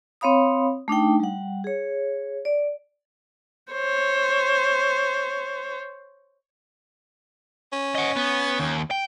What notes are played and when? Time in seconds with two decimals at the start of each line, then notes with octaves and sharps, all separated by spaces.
0.21 C4 C#5 F5 B5 D#6
0.88 A3 D4 D#4 G5
1.20 G3 F#5
1.64 G#4 C#5
2.45 D5
3.72 C5 C#5
7.73 C#4
7.95 D#5 F#5
8.16 B3
8.59 D#2
8.91 G5